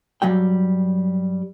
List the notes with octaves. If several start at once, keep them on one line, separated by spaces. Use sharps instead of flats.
G2 F#3 G3 G5